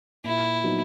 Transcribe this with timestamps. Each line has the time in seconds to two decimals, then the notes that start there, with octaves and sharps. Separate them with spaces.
0.24 A#2 E4
0.64 F#3 B3 D#4